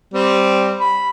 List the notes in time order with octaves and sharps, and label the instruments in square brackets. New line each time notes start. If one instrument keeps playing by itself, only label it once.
[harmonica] G3 C4
B5